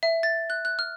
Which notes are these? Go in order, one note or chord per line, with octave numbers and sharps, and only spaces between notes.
E5
A6
F#6
F#6
F6